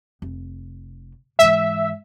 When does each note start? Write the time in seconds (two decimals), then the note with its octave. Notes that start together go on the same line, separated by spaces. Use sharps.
0.22 F1
1.39 G#2 E3 E5